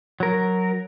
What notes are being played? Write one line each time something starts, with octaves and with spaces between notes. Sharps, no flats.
F#3 A#4